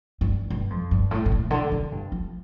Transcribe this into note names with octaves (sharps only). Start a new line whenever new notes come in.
G2
G2
F2
G2
A2
A2
A#2
D3
D3
G2
F3